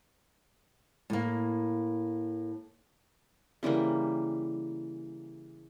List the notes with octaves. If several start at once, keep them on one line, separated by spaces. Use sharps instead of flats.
A2 A#3
C#3 E3 G3 A#3